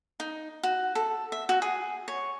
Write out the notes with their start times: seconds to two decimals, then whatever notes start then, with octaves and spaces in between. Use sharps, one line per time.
0.20 D#4
0.63 F#4
0.95 A4
1.32 E5
1.49 F#4
1.62 G#4
2.08 C#5